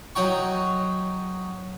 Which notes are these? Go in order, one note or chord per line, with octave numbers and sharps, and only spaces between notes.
F#3 D#4 G5 C#6